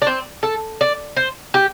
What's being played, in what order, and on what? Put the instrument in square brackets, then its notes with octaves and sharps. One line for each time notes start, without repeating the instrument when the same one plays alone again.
[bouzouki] D4
C4
A4
D5
C5
G4